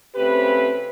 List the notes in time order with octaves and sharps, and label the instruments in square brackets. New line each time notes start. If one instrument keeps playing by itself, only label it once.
[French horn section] C#3 A3 C4 G4 B4